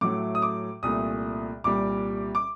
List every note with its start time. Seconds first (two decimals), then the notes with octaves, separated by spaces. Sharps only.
0.01 A2 F#3 A3 D6
0.35 D#6
0.42 D6
0.83 C2 A#2 A3 D#6
1.64 C2 A#2 G3 D6
2.35 D6